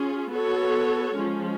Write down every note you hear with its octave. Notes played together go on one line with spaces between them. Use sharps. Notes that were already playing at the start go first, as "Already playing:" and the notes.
Already playing: C#4 F4 G#4
B3 F#4 A4 C#5
F3 G#3 C#4